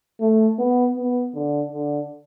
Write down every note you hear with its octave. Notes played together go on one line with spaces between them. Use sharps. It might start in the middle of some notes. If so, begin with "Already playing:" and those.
A3
B3
B3
D3
D3